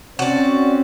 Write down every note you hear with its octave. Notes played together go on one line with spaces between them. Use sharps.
C4 C#4 F#4 D5